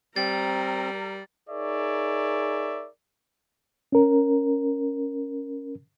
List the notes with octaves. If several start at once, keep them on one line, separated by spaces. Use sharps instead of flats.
G3 C4 A#4 A#5 A6
D#4 G#4 A#4 C#5 D5 E5
C#4 A#4